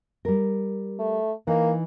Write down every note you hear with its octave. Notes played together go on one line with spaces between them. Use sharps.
G3 A#4
A3
E3 A#3 D#4